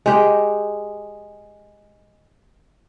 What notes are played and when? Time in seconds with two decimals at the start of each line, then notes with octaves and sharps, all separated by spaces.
0.06 G#3 G4 G5